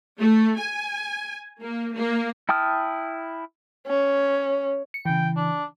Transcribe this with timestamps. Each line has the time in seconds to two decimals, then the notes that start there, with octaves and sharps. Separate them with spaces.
0.18 A3
0.57 G#5
1.61 A#3
1.94 A#3
2.49 E4 G5 A5 D#6 F6
3.87 C#4
4.94 C#7
5.05 C#3 E3 G5
5.36 D4